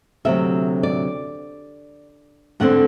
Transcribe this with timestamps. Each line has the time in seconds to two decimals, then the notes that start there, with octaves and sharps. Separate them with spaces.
0.25 D2 C3 F#3 E5
0.83 D5
2.60 D2 D3 A3 C4 F#5